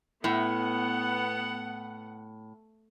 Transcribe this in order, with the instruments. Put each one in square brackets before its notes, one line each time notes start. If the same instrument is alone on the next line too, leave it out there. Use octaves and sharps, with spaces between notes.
[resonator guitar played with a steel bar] A2 [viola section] B3 F#5